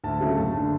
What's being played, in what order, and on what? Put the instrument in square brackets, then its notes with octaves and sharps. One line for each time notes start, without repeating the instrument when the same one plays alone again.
[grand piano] D2 A5
C#3 F#3 A3
F#1 A5
D3